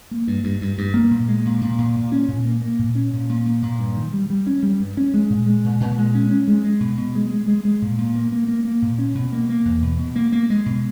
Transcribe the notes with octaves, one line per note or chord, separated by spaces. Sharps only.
A#3
G2
G2
G2
G2
A#3
A#2
G#3
A#2
A#2
A#2
A#2
C#4
A#2
A#3
A#3
A#2
C#4
A#2
A#2
A#2
A#2
G2
D#3
G3
G3
C#4
G3
G2
C#4
G#3
A#2
G#3
A#2
A#2
G#3
C#4
C#4
G#3
G#3
B2
B2
G#3
G#3
G#3
G#3
A#2
A#2
A#3
A#3
A#3
A#3
A#2
C#4
B2
A#3
A#3
E2
B2
B2
A#3
A#3
G#3
B2